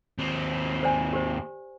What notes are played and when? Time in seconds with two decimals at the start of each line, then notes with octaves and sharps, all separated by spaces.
0.18 D#2 C4
0.83 C5 D5 G#5
1.13 G4 C5